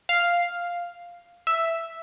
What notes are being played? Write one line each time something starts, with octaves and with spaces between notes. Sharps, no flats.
F5
E5